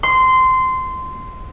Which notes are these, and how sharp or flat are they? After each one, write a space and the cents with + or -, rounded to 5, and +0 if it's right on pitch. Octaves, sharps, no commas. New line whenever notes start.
C6 -15